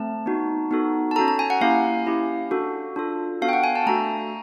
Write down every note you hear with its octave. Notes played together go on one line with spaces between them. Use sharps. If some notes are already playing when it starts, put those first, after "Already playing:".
Already playing: A3 C4 A5
B3 D#4 F#4
B3 D#4 F#4 A4
A5
C#4 F#4 A4 A#5
A#5
G#5
F#5
A#3 C#4 E4 G4 F5
C#4 E4 G4
D4 F#4 A4
D4 F4 A4
B3 D4 F#4 A4 F5
G5
F#5
G#5
A5
A3 D4 F#4 A4 A#5